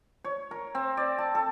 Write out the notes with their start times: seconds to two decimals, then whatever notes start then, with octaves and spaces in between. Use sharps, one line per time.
0.24 C#5
0.51 A#4
0.75 C4
0.97 D5
1.18 A5
1.35 A4